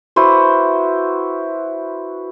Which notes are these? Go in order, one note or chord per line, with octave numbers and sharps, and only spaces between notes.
E4 F#4 B4 C5